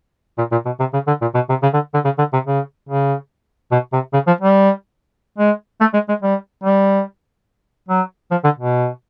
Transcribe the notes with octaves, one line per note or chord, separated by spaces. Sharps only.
A#2
A#2
B2
C3
C#3
D3
A#2
B2
C3
C#3
D3
D3
C#3
D3
C3
C#3
C#3
B2
C3
C#3
F3
G3
G#3
A3
G#3
G#3
G3
G3
F#3
F3
D3
B2